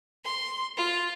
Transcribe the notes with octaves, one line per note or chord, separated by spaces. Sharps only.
C6
F4